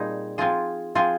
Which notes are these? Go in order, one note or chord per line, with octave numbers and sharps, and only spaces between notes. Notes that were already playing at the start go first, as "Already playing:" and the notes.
Already playing: A#2 G3 C4 D#4 G#4
F3 C4 F4 G#4
F3 C4 F4 G#4